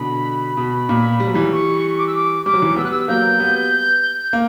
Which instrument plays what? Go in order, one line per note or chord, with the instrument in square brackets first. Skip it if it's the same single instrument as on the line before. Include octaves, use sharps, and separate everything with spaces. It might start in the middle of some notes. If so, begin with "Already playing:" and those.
Already playing: [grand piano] B2 D3 [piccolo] B5
[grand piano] B2
A#2
G3
F#3
E3 G3
[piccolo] C#6
D6
E6
D6
[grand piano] G3 [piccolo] D6
[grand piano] F#3
E3 G3
[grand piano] G3 B3 [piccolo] E6
[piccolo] F#6
E6
[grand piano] F#3 A#3 [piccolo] G6
[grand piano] G3 B3
A#3